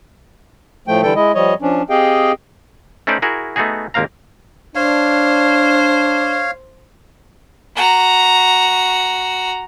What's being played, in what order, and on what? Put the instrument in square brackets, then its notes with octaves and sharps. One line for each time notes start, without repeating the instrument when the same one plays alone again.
[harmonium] A2 F3 A3 G5
D3 E3 G3 A4 G5
G#3 E4 D#5
F3 G3 C#5 D#5
F3 C#4 D4
C4 G4 G#4 D#5 F5 G5
[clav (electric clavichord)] A3 C#4 D#4 B4 C5 D5
E4 F#4 G#4 A#4
A3 B3 D#4 F#4 G#4
G#1 D#2 A#3 C4 F5 A#5
[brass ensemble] D4 [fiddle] C5 [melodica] C#5 F5
[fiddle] F#4 A#5